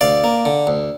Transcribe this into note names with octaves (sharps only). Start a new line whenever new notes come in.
D2 D5 F5
A#3
D3
D2